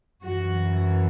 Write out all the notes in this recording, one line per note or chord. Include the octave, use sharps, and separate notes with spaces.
F#2 E3 F#4